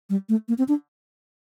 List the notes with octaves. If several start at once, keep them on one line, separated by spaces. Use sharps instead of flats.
G3
A3
A#3
C4
D4